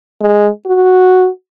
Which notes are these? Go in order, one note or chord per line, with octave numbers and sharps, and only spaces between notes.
G#3
F#4